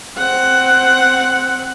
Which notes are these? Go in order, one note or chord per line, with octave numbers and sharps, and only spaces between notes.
C4 F#5